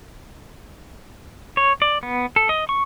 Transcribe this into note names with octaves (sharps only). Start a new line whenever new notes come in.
C#5
D5
B3
A4
D#5
C#6